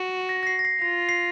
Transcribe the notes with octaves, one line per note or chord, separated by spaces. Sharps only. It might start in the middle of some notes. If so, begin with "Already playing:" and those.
Already playing: F#4
A#6
A#6
C7
A#6
C7
F4 A#6
C7